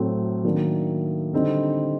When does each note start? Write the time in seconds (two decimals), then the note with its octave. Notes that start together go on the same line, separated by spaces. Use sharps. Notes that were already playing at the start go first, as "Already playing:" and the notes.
Already playing: A2 F#3 A3 C4
0.44 D#3 F#3 A#3 D4
1.33 D3 G3 C4 D#4